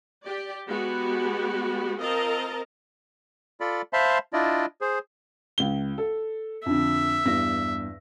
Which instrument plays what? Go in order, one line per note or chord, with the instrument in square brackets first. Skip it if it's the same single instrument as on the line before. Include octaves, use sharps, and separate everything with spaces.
[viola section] G4 D5
G#3 B3 F#4 G4
C4 F4 A#4 D#5 A5 A#5
[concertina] F4 A4 D5 B5
C5 E5 F5 A5 B5 C6
D4 E4 F4 D5 D#5
G#4 C5
[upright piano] C#2 G7
A4
[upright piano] F2 D3 [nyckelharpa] E5
[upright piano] E2 G2 A#6